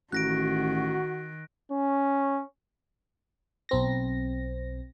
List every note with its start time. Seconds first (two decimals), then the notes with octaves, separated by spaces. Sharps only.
0.12 A1 D#3 F#4 F#6 A#6 D7
1.72 C#4
3.69 B1 C4 A#6